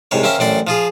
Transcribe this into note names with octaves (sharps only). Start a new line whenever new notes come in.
C2 G#2 C3 C#5
A#3 C4 C#4 E5
A1 F#2 C4 D5 C6
F3 F4 G#4